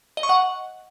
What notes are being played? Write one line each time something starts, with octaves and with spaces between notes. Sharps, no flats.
D#5
C#6
F#5